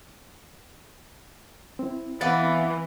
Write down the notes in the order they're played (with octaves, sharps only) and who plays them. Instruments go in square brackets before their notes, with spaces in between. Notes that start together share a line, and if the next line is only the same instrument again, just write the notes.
[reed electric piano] C4 E4
[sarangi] E3 [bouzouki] B3 B4 D5 [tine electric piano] E5 F5 A6